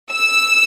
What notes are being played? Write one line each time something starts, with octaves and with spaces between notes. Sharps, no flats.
E6